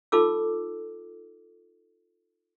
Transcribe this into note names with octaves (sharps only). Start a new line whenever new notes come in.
D#4 F4 A4 D6 E6